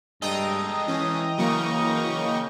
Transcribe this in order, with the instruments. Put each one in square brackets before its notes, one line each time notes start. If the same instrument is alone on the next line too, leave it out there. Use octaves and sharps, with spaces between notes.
[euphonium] G2 [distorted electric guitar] G#3 A4 [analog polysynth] D#5 G5 A#5
[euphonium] E3 [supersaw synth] C#4
[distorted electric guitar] C#3 [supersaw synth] F#3 A#3 C#6